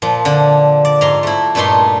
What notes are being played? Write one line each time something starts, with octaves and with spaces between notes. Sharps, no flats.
A#2 F3
D3
D5
G#2 A#5 C6
A3 E4
G2 A#2 A3 D#4 A4 C6